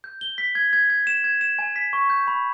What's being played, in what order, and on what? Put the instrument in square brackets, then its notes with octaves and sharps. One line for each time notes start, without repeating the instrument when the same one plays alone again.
[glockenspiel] G6
G7
B6
G#6
G#6
G#6
E7
G#6
E7
G#5
B6
C#6
G6
B5